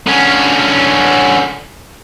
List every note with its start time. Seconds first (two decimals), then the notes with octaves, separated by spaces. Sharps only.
0.07 D3 C#4